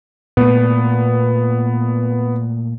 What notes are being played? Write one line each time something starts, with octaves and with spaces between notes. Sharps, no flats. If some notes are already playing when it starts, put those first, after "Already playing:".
A#2 A3 B3